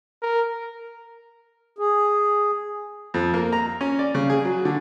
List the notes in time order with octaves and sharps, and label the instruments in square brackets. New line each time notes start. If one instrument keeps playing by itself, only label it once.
[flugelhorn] A#4
[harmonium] G#4
[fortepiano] F2
A#3
A#5
C#4
D5
C#3
G#4
F#3
D3